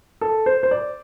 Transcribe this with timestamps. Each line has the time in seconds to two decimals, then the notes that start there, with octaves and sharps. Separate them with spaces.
0.21 A4
0.46 C5
0.63 C5
0.71 D5